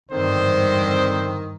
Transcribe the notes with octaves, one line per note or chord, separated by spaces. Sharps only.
G#1 E2 G2 D3 D#3 C4 C5